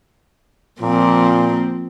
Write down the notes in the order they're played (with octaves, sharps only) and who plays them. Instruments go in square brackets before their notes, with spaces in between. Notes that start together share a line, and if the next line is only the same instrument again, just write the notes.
[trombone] A#2 [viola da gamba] F3 A#3 C4